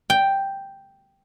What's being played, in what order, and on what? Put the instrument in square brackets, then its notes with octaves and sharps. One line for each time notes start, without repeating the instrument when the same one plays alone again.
[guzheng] G5